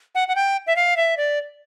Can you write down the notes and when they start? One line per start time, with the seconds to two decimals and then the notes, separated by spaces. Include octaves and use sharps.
0.15 F#5
0.28 F#5
0.36 G5
0.67 E5
0.76 F5
0.97 E5
1.17 D5